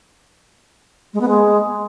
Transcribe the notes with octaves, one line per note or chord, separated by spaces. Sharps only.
G#3
B3
G#3